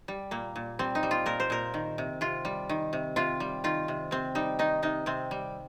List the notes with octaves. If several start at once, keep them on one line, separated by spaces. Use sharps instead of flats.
G3
A#2 A#3
A#2
G3 C4
D#4
G3
F4
A#2 A#4
C5
A#2 A#4
D#3
C3
C3 F4
G3
D#3
C3
C3 F4
G3
D#3 F4
C3
C3 C4
G3 D#4
D#3 D#4
C3 D#4
C3 C4
G3